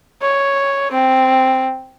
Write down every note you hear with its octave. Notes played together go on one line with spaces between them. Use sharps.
C#5
C4